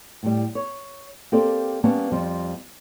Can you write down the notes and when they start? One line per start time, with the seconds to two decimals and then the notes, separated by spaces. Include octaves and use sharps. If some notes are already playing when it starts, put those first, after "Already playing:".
0.23 A2 G3
0.55 C#5
1.32 A#3 C4 G4 A4 D5
1.84 G3 A#3 B3 C#4 A5
2.12 F2 F3 G3